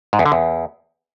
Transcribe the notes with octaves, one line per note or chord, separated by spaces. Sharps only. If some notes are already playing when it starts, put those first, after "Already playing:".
G#2
E2
D3
E2